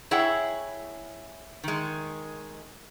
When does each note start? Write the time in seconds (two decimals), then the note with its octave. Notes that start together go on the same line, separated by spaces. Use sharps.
0.11 E4 G#4 C#5 F#5 G5
1.64 D#3 G#3